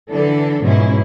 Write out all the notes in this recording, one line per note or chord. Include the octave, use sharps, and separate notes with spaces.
D3 E3 D4 A4
G#2 B2 F3 G#3 C#4 E4